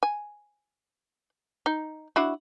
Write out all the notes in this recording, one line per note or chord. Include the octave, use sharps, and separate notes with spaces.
G#5
D#4
D4 E4 F#4